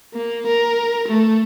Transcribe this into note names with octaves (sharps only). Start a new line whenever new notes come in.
A#3
A#4
A3